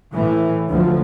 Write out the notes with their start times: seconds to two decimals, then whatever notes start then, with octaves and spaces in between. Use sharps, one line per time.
0.14 A2 E3
0.70 D2 F3